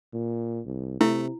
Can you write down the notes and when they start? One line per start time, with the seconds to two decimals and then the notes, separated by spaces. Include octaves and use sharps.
0.13 A#2
0.66 C2
1.01 C3 A3 E4